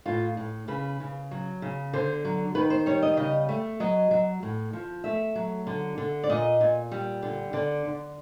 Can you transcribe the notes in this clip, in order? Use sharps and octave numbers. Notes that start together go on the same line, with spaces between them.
A2 F4
A2
C#3 B4
C#3
F#3
C#3
D3 C5
F#3
D#3 B4
C5
G3 C#5
D#5
C#3 D#5
A3
F#3 D#5
F#3
A2
F3
A3 E5
F#3
D3
D3
D5
A#2 D#5
A#2
G3
D3
D3 D5
D3